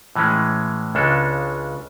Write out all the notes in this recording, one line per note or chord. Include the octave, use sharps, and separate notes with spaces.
A2 E3 G#3 C#4
C#2 C#3 G#3 D4 A4